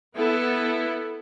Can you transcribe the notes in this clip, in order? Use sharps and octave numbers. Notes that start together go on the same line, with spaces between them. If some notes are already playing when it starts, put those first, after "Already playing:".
B3 E4 A4